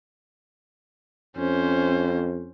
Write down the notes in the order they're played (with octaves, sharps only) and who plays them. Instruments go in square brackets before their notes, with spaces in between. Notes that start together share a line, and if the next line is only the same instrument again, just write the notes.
[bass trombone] F2 [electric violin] C#4 C5